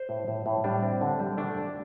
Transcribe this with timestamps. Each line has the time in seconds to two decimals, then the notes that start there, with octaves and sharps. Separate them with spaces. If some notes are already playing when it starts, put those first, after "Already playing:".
Already playing: C5
0.09 A2
0.28 A2
0.46 A2
0.64 G3 D4
0.83 C4
1.01 D3
1.20 G3
1.37 A3 D4